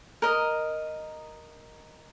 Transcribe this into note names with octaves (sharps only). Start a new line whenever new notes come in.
A#4 D#5